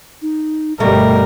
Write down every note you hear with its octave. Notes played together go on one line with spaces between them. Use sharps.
D#4
G1 B2 G3 A3 A#4 D#5